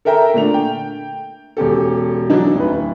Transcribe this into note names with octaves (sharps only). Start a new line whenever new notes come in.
A4 A#4 E5 G5 A#5
A#2 D3 A3 D4 F7
G5
E1 C#4 G4 A4
D3 E3 F#3 D4 D#4
D1 B4